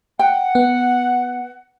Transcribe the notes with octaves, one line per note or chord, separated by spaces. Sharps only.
F#5 G5
B3